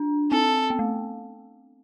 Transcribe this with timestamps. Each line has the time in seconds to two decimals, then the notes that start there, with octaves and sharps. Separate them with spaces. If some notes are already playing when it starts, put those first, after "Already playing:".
Already playing: D4
0.31 C4 A4
0.70 B3
0.79 A3